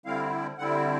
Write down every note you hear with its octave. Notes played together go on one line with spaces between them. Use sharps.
D3 G3 C4 E4 F5
D3 G3 C4 E4 F#5